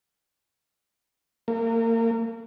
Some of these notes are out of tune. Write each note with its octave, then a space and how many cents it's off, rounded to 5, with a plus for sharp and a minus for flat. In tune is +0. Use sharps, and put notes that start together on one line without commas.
A#3 -30